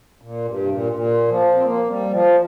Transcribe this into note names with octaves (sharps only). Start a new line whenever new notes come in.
A#2
G2
C3
A#2
A#2
F3
C4
A#3
G3
F3